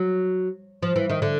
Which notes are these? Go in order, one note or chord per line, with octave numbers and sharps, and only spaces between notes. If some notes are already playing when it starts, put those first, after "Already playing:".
Already playing: F#3
F3
E3
D#3
D3